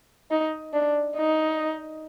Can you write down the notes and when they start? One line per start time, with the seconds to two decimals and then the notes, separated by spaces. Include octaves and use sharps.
0.31 D#4
0.73 D4
1.17 D#4